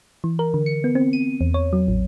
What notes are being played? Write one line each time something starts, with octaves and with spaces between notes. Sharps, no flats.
E3
A#4
D3
C#7
B3
C4
D#7
E2
C#5
F#3
A1